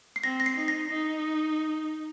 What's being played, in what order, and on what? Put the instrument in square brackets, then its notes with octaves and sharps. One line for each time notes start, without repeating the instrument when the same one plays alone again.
[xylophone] C7
[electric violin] C4 [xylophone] A#6
[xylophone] A#6
C7
[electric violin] D#4
[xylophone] A#6
[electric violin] D#4